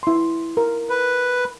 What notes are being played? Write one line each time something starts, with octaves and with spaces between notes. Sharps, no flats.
E4 C6
A#4
B4